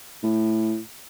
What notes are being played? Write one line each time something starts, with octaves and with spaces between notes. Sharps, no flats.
A2